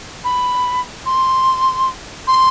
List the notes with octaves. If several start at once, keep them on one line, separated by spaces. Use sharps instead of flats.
B5
C6
C6